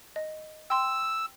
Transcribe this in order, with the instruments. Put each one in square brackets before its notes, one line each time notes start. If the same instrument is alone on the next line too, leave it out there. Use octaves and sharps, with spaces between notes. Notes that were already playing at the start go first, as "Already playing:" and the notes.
[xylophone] D#5
[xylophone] G5 C6 [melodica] E6